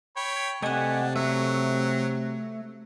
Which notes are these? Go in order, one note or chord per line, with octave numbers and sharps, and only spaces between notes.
C#5 G5 B5
C3 A3 D4 G4 A4 D#5 F#5 G#5
F#3 A3 E5